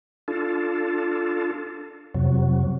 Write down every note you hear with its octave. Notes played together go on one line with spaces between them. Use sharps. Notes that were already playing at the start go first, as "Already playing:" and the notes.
D4 F4 A4
F2 C3 F#3